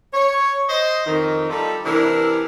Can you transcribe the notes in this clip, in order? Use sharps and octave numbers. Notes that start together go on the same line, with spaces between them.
C#5
C5 D#5
F2 D#3
G3 D#4 F4 A4
C3 E3 D4 E4 A#4